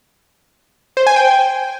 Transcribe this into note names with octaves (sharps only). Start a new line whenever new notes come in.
C5
G#5
G5